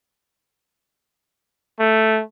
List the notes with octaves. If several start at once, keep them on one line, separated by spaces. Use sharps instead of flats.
A3